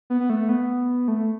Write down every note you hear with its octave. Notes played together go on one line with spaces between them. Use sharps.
B3
B3
A3
B3
A3